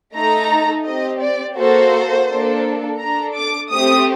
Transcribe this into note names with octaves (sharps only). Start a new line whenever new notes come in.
A3 D#4 A4 A#5
C4 G4 D#5
D5
A#3 F#4 A4 C5
A#3 D4 A4
D4 A4 A#5
D6
A3 C4 G4 D#6